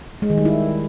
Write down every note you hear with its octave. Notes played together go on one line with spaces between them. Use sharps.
G#3
D#3
G3
E4